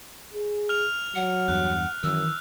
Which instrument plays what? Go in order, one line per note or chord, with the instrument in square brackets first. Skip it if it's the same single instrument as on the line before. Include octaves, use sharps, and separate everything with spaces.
[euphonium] G#4
[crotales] F6 F7
[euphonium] F#3 [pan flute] F#5
[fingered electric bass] E2 G2 [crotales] F#6
[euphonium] F#2 [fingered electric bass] D#3 E3 [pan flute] E6